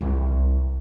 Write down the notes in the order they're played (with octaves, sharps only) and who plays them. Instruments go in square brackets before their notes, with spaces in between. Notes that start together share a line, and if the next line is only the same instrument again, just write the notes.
[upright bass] C2 C3